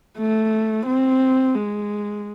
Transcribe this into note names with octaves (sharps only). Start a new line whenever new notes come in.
A3
C4
G#3